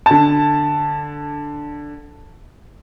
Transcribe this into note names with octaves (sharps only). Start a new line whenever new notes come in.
D3 A5